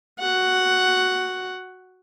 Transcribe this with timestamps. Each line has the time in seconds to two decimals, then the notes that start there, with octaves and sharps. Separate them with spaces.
0.20 F#4 F#5